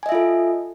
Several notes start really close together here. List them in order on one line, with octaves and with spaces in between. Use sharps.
G#5 D#5 E5 F4 A4